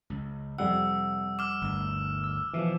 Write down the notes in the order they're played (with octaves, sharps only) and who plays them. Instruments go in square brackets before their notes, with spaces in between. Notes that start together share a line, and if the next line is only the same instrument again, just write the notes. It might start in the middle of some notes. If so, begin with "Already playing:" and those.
[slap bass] C#2
[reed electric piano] F2 G3 F#5 [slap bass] C3 [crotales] E6
[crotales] D6 F6
[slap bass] G1 D2
[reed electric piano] E6
[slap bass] B2 [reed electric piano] E3 F3